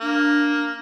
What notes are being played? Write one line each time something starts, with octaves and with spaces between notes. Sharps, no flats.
A#3 D4